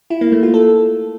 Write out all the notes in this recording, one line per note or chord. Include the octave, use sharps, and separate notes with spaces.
E4
A#3
A3
F4
A4